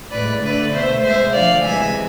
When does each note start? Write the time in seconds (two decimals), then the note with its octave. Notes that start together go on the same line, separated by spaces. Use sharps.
0.11 A2 G#3 B4 D5
0.41 D3 A3 B4 D5
0.72 B2 A3 C5 E5
1.03 B2 G#3 C5 E5
1.33 D3 F3 A3 D5 F5
1.64 C3 E3 G#3 E5 G#5